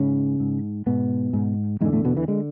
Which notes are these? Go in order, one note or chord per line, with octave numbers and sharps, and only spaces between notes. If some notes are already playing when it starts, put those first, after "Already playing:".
Already playing: G#2 C#3 C#4
G#2
G#2 B2 B3
G#2
E2 G#2 D3 G#3
A2 A3
B2 B3
E3
D3 G#3